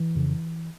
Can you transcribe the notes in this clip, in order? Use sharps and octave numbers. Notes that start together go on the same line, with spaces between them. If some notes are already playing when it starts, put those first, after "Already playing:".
Already playing: E3
F2 C#3